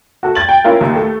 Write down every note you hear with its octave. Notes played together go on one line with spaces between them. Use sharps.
F#4 A4
G#6 A6 F#7
G5
C#4 E4 F4 A#4
D#2
A3